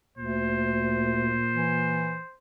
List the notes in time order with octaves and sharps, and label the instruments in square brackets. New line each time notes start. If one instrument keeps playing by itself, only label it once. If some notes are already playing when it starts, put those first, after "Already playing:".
[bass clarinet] D2 [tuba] A#2 [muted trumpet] C5
[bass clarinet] E3